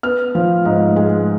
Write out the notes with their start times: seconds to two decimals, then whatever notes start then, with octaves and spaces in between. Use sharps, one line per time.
0.03 B3 F6
0.35 F3
0.65 G#2
0.96 G#3